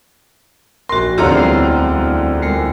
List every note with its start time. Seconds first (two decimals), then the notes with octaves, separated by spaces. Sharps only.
0.89 A#1 F#4 A#4 C6
1.18 D1 E2 D3 C4 F4 G4 C#5 A#5
1.37 G3
2.42 G3 G#3 A#4